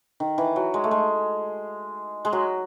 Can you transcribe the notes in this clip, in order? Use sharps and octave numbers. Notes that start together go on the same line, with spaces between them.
D#3
E3
F#3
G#3
A3
G#3
G#3
F#3